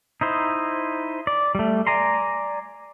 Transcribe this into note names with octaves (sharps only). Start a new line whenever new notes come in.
D#4 E4 C5
D5
G3 A3
D5 G#5 A#5 C6